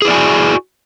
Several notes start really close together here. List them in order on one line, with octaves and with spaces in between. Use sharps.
G#4 E4 D5 G#5 F#4